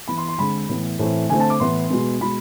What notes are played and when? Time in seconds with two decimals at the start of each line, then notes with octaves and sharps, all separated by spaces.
0.08 E3 B3 B5
0.18 C6
0.28 C6
0.38 D3 G#3 C4 B5
0.69 A2 E3 B3
0.99 A2 E3 A3 C4
1.30 D3 A3 C4 G#5
1.40 A5
1.50 D6
1.60 A2 E3 B3 C6
1.90 B2 G#3 B3
2.21 B2 G#3 B5